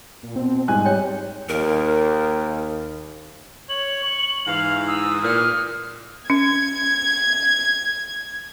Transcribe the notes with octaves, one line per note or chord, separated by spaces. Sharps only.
A#2
B2 C4
G#2 G3 G#5 F#6
C#5 G5
D#2 A#4
C#5 F#7
C#6
G#2 E3 F5
D#6 E6
A#2 F6
C#4 G#6